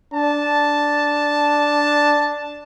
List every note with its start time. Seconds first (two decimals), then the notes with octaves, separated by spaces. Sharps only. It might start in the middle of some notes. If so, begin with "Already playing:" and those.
0.14 D4 A5